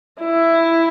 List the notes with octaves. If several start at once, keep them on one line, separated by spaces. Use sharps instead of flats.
E4